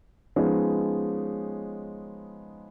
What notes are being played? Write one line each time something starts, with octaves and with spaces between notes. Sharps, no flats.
F3 G#3 B3 C#4 D#4